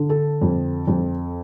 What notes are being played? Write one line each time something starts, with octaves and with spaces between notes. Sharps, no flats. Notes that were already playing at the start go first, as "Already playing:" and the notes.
Already playing: D3
A4
F2
F2